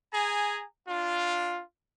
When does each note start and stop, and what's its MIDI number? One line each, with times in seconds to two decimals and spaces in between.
0.12 0.63 68
0.12 0.63 80
0.12 0.63 82
0.87 1.61 62
0.87 1.61 65